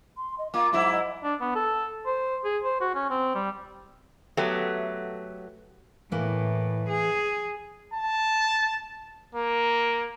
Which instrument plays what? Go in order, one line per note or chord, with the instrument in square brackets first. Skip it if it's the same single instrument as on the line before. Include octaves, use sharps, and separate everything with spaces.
[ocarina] C6
D#5
[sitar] A#3 F4 [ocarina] D6
[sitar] G#2 F#3 E4
[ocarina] D#5
[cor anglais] D4
B3
A4
C5
G#4
C5
F#4
C#4
C4
G3
[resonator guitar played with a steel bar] F#3 A3 B3 G4
[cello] A2 [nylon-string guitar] E3 A#3
[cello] G#4
[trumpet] A5
A#3